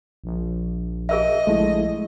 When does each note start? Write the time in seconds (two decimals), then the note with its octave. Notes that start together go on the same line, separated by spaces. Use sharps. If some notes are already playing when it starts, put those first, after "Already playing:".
0.24 A#1
1.09 G#4 A#4 D#5 E5
1.47 A#1 G#3 A3 E4